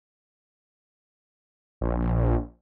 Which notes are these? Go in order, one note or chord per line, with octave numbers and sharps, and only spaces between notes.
A#1